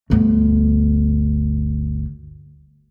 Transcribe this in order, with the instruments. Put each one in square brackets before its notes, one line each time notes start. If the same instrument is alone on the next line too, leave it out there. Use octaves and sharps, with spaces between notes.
[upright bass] G1 D2